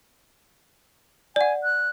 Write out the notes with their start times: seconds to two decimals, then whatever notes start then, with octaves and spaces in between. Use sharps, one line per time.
1.36 D5 F#5 G#5
1.64 F#6